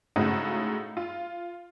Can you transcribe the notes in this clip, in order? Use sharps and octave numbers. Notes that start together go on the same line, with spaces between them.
A2 C#3 G#3 C4 D#4 F#4
F4